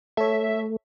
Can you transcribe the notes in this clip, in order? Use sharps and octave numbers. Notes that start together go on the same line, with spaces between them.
A3 A4 C#5 E5